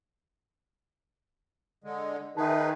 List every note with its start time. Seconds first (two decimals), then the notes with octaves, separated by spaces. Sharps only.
1.84 D3 G#3
2.37 D#3 D#4 G#4 B4 E5 A5